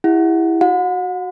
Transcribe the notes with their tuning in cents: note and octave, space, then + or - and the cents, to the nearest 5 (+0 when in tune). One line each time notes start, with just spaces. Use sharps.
E4 +0 G4 +35 F#5 +0
F#4 +0 F#5 -40